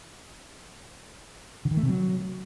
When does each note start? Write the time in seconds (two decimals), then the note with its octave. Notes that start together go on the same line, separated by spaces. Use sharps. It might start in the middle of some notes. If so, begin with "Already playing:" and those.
1.65 D3
1.71 D#3
1.77 A3
1.83 C3
1.89 F#3